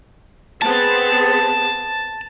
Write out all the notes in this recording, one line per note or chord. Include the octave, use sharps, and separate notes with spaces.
B3 C4 G#4 A5